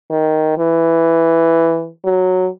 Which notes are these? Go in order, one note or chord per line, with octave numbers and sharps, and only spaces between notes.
D#3
E3
F#3